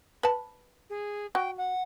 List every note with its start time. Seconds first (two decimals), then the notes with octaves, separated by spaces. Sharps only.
0.23 B4 A5
0.90 G#4
1.35 F#4 G5
1.58 F#5